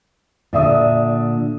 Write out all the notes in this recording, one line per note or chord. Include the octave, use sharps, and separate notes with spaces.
A#2 D3 D5 E5 D#6